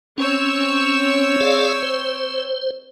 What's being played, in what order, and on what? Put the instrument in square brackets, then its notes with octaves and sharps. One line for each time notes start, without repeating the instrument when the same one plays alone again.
[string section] C4 C#5 E6 [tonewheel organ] C#4
[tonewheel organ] G#4 D5 F5
C5